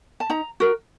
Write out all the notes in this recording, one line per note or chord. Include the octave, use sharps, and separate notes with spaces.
A5
D#4 A#5
F#4 A#4